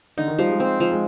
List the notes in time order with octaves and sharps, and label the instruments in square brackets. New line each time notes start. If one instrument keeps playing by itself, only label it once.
[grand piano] D3 [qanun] D#4
[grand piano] D#3
[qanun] F3 [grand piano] G3
[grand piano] G#3
[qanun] C4
F3
[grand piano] G#3